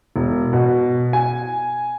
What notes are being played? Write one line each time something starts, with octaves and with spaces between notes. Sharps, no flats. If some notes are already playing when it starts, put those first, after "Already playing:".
E1
B2
G#5